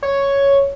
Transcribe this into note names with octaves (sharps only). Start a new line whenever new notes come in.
C#5